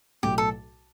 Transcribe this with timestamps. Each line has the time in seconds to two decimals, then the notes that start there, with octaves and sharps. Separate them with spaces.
0.23 B1 A2 F#3 G4
0.38 A4